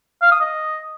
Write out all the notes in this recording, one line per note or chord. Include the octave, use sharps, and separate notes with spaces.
F5
D#6
D#5